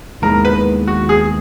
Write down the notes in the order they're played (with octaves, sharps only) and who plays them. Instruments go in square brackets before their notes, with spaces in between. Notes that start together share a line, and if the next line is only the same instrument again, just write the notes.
[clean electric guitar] D#2 D#3 G#3 B3 E4 [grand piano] A#4
[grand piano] B4
F#4
G#4